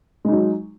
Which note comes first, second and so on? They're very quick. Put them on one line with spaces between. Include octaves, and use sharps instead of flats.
G#3 D#4 F#3